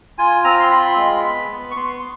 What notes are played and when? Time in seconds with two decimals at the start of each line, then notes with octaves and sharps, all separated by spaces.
0.18 F4 G#5
0.44 C4 A#5
0.59 C6
0.70 F4 B5
0.97 G#3
1.24 B3
1.50 B3
1.71 C#6
1.76 B3 C6
1.93 C6